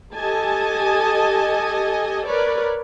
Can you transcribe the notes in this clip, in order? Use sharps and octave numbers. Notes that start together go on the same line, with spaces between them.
G4 A4 D#5 G#5 A5
A#4 B4 C#5 D5